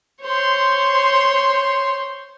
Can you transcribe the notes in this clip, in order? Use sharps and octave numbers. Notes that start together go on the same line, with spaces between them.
C5 C#5 C6